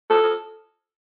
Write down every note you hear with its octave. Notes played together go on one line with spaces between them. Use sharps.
A4